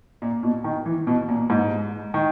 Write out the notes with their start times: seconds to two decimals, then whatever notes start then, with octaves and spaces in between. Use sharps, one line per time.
0.22 A#2
0.43 B2
0.64 D#3
0.86 E3
1.07 B2
1.29 A#2
1.50 G#2
2.14 D#3